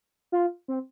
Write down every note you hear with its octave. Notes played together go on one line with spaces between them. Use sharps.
F4
C4